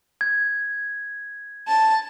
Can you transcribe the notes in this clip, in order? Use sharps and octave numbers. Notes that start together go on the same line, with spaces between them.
G#6
A5